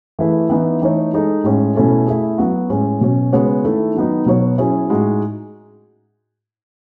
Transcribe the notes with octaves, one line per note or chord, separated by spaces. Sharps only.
E3 A3 E4 G#4 B4
E3 B3 D#4
E3 A3 D#4 A4 C#5
G#3 D#4 A4
A2 G#3 C#4
B2 A3 C#4 E4 A4
A3 E4 G#4
F#3 B3 F#4
A2 G#3 C#4
B2 F#3 C#4
C#3 G#3 B3 F#4 C#5
D#3 A3 E4 A4
D#3 F#3 B3 D#4
B2 F#3 B3 F#4 C#5
F#3 C#4 E4 G#4 C#5
A2 G#3 D#4 F#4